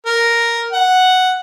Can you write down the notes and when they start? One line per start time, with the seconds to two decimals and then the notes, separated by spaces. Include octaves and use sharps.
0.06 A#4
0.72 F#5